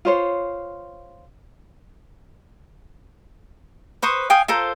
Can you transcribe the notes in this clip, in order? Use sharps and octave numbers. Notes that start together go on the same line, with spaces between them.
F4 C5 C#5
B4 C5 C#6 D#6
F5 G5 G#5 D#6
F4 A4 A#4 C5